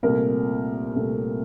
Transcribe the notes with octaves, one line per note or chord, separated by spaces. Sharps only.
C2 A#2 A3 C4 A#4
C2 A#2 A3 C4